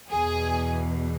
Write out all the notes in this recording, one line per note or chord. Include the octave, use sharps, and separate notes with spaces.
E2 B2 G#4